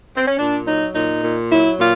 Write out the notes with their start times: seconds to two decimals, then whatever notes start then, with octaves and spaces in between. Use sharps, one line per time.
0.16 C4
0.26 C#4
0.37 A#2 D4
0.66 F#3 D#4
0.95 A#2 D#4
1.23 A#2
1.51 F#3 E4
1.79 A#2 F4